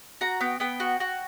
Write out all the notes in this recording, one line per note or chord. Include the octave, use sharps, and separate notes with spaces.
F#4 A#5
B3 G5
B3 G5
F#4
F#4